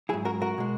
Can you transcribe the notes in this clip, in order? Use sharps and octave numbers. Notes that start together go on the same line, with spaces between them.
G#2 F#3 E4 G#4
F#4 A#4
F#4 A#4
B2 G#3